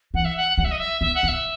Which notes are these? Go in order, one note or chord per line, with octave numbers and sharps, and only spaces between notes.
E3 F#5
E5
F#5
G3 F#5
E5
D#5
E5
B3 E5
F#5
B3
E5